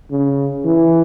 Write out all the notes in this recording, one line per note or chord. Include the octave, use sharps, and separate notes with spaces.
C#3
E3